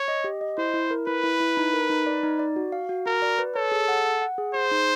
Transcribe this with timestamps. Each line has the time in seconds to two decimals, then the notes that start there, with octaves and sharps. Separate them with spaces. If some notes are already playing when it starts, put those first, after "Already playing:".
Already playing: C#5
0.08 D#5
0.24 G4
0.41 D#5
0.58 E4 C5
0.74 E4
0.91 A#4
1.07 E4 B4
1.23 E4
1.40 E4
1.57 D#4
1.73 A#4
1.90 D#4
2.06 D5
2.23 D#4
2.39 D5
2.56 F#4
2.72 F5
2.89 F#4
3.06 F#4 A#4
3.22 D5
3.39 B4
3.55 A4 C#5
3.72 G#4
3.88 F#5
4.05 F#5
4.22 F#5
4.38 G#4
4.54 G#4 C5
4.71 D#4